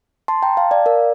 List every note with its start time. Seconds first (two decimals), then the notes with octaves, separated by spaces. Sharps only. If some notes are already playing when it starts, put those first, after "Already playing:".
0.28 A5 C6
0.42 G5 A#5
0.57 F5 A5
0.71 D5 F5
0.86 A#4 D5